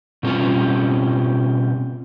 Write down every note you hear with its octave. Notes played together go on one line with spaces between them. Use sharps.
B2 G3 C4 C#4 F4